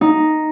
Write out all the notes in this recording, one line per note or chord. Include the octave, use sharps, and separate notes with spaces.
D#4